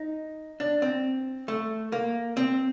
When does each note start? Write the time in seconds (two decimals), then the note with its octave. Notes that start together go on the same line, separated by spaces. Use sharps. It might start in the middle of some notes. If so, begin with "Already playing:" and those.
Already playing: D#4
0.60 D4
0.82 C4
1.48 A3
1.92 A#3
2.37 C4